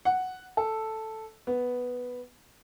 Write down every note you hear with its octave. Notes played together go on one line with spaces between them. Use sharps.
F#5
A4
B3